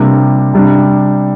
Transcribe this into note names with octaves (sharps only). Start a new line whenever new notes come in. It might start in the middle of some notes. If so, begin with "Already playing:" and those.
Already playing: C3 G3 A#3 D4
C3 G3 D4